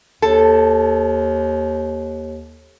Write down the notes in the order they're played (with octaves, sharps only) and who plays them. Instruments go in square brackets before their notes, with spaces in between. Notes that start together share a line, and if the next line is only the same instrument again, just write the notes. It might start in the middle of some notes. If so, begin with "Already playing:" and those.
[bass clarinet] D#2 [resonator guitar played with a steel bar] A4